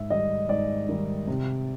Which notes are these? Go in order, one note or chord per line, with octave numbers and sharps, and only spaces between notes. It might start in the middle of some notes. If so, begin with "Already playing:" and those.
Already playing: G#2 E5
D#3 G3 D#5
G#2 D5
D#3 G3
C3